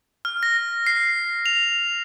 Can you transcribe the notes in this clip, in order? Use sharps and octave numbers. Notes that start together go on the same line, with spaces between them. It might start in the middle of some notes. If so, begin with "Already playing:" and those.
F6
A#6
C7
F7